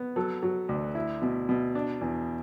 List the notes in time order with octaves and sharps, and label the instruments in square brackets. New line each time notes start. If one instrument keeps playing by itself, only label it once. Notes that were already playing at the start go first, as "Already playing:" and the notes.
Already playing: [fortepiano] B3
F#3 A4
F#3
D2
E4
B2
B2
D4
E2